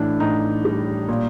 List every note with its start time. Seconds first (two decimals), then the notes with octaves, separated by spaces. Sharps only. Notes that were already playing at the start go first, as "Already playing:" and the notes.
Already playing: A2 E3 D4
0.20 A2 D#4
0.65 G3
1.08 A#2